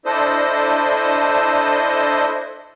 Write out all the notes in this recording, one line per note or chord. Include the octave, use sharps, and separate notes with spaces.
D4 E4 A4 C5 D#5